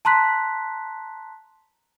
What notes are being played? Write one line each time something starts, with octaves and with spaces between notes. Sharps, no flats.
A5 A#5 C6 F#6 B6